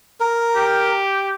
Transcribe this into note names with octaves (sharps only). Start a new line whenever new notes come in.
A#4
G4